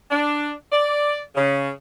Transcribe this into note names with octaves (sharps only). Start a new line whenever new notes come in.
D4
D5
C#3